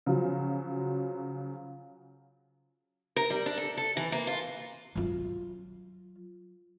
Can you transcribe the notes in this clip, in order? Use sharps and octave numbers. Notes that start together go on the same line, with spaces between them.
C#3 F3 F#3
A#4
G3
D4
A4
A4
E3
A#3
F4
F#3 F4